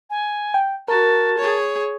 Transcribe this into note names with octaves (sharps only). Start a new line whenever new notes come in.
G#5
G5
F#4 A#4 A5
G#4 C#5